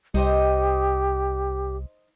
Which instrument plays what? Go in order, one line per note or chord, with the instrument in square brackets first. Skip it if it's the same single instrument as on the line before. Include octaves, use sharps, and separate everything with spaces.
[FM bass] C2 [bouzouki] D#4 C5 D#5 [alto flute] G4